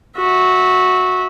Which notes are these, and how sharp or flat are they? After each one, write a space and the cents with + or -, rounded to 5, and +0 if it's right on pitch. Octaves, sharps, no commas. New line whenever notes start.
F#4 -10 E5 -20